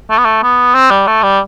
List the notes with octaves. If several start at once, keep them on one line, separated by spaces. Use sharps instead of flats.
A3
B3
A3
B3
C4
G3
A3
G3